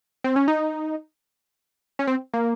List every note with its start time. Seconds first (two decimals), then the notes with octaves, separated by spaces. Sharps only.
0.24 C4
0.36 C#4
0.48 D#4
1.99 C#4
2.07 C4
2.34 A#3